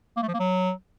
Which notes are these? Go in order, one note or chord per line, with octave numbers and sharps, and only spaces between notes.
A#3
A3
F3
A#3
F#3